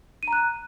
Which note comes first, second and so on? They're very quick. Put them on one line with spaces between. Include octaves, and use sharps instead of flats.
D#7 A#5 F#6